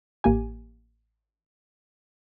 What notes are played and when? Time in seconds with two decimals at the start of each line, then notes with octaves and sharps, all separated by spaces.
0.24 A1 A#3 G4 G#5